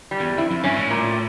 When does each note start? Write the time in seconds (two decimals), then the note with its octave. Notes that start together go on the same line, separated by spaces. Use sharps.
0.11 G3
0.20 E2
0.37 F2 E4
0.51 F2
0.63 G2 C#4
0.77 A2
0.91 A#2